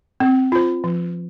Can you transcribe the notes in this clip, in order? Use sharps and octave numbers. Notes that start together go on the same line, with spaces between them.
C4
F4 C5
F3